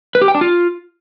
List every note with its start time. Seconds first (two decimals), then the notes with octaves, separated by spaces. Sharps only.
0.15 B4
0.22 G4
0.28 G5
0.35 D4
0.41 F4